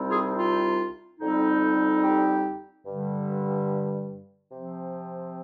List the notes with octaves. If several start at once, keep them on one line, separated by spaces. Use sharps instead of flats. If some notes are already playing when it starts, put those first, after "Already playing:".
Already playing: C2 C3 G3 C4 D#4
F4 G#4
F4
F2 D3 G3 C4 D#4
G4
G2 D3 G3
C3 F3 C4